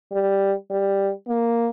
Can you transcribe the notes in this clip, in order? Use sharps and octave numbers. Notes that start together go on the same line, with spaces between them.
G3
G3
A#3